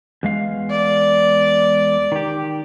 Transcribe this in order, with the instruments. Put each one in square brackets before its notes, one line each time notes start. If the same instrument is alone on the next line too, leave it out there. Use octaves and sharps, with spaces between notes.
[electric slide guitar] E2 G#3 F5
[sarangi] D5
[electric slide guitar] D#3 G4